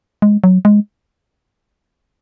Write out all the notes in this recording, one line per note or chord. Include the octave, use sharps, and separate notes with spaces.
G#3
F#3
G#3